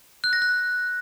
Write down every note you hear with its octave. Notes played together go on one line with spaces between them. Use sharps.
F#6
A#6
F#6